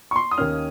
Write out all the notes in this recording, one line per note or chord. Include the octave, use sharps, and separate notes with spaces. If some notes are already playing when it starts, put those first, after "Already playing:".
C#6
C6
D#6
D#2 D#3 A#3 C#4 F6